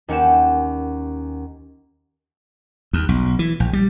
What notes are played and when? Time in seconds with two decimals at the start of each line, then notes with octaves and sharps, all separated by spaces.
0.08 D#2 C#4 F#5 G5 E7
2.93 D#2
3.09 B1
3.39 E3
3.60 A#1
3.73 G3